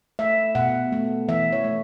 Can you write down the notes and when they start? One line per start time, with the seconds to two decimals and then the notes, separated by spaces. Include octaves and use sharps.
0.19 A3 E5
0.55 B2 F#5
0.92 A3
1.28 E3 E5
1.53 C#5
1.64 A3